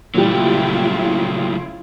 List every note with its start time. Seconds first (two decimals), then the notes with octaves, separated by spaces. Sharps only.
0.14 A#2 C#3 E3 F#3 G3 A3 E4 F4